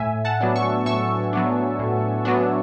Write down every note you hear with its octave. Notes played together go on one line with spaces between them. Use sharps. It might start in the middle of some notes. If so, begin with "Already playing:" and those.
Already playing: A2 E5 G#5
F#5 A5
F#3 B3 D4
C#6 E6
A2 C#6 E6
F#3 B3 D4
A2
F#3 B3 D4